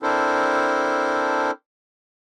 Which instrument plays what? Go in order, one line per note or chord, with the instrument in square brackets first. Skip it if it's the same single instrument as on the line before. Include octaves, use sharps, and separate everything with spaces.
[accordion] C4 D4 E4 A4 A#4 C5